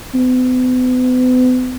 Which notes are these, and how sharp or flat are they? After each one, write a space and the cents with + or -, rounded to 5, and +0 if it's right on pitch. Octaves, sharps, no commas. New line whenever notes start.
B3 +40